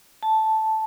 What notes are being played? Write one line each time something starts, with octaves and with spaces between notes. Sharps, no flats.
A5